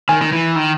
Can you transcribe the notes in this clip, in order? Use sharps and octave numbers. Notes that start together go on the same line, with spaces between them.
D#3 G#5
D#3
E3
D#3